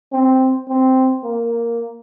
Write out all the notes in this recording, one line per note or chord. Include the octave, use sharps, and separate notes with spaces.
C4
C4
A#3